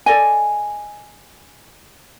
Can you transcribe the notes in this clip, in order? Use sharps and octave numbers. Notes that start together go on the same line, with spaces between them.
A4 D5 D#5 G#5